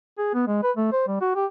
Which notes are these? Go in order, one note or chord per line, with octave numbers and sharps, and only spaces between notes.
G#4
B3
G#3
B4
A3
C5
G3
F#4
G4